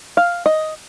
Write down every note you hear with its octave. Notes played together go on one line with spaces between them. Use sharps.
F5
D#5